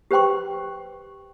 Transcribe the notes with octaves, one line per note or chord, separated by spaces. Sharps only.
G4 B4 C5 G5 C6 C#6